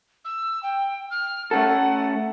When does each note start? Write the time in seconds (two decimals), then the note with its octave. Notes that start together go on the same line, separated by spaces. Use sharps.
0.25 E6
0.63 G5
1.10 F6
1.51 A3 C#4 A4 F#5